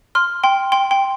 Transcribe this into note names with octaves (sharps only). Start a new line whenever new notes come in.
C6 F6
G5 C6
G5 C6
G5 C6